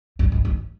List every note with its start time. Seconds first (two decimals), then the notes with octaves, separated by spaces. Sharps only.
0.19 G2
0.32 G#2
0.45 G#2